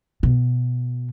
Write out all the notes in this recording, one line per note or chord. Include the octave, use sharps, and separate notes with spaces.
B2